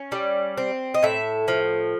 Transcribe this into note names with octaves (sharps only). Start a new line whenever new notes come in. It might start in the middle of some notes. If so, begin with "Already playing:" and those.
Already playing: C#4
G3
C4
D#5
A2 E5
F3